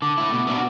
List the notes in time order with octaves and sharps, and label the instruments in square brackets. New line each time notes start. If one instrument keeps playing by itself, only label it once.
[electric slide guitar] D3 [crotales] D6
[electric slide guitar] A3 E4
B2
B3 D4 F#4